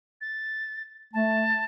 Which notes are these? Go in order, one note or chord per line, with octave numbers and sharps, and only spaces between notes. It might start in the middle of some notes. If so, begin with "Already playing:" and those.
A6
A3 A5